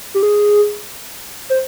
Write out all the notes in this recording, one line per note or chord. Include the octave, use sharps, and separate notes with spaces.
G4
G#4
C5